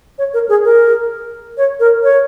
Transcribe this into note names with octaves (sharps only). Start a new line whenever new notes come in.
C#5
A#4
G#4
A#4
C#5
A#4
C#5